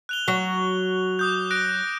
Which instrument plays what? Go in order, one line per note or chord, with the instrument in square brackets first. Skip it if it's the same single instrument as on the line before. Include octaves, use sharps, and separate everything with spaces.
[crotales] F#6 F7 G7
[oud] F#3
[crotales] D6 D#6 G6
F#6 A#6 D7